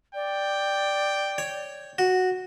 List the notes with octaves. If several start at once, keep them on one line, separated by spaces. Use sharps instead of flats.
D5 G5
C#5
F#4